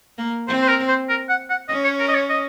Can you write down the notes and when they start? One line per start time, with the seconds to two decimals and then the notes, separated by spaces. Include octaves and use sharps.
0.18 A#3
0.48 C4 C5
0.61 C5
0.68 A#4
0.88 C5
1.09 A#4
1.29 F#5
1.50 F#5
1.69 C#4 D#5
1.84 C#5
1.99 A#4
2.08 D#5
2.15 C#5
2.29 D#5